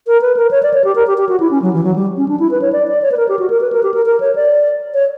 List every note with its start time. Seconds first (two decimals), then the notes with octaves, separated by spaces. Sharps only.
0.07 A#4
0.21 B4
0.36 A#4
0.51 C#5
0.63 D5
0.74 C#5
0.84 G4
0.95 A#4
1.07 G4
1.18 G4
1.29 F#4
1.40 E4
1.51 C#4
1.62 F#3
1.73 E3
1.84 F#3
1.96 G3
2.17 C#4
2.28 D4
2.39 E4
2.51 B4
2.61 C#5
2.72 D5
2.87 D5
3.02 C#5
3.11 B4
3.17 A#4
3.28 G4
3.39 F#4
3.50 A#4
3.61 B4
3.72 A#4
3.83 G4
3.94 A#4
4.06 A#4
4.20 C#5
4.35 D5
4.94 C#5